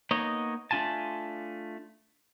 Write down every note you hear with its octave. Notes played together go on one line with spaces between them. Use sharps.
A#3 B3 D#4 C#5 D#5
A3 D4 F4 G#5 A5